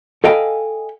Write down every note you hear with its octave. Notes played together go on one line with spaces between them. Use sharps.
A4 D#5 F5 G5 G#5 B5